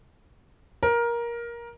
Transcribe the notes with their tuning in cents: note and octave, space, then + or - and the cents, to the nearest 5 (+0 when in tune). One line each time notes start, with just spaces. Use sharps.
A#4 +15